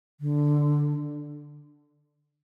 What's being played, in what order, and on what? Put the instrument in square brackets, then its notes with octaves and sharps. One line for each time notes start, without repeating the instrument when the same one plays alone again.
[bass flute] D3